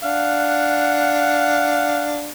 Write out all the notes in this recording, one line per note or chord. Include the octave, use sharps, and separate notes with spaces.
D4 F5 F#5